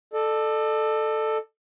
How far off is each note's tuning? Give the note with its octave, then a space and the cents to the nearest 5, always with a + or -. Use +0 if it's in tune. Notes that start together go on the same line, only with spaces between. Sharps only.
A4 +0 D5 +45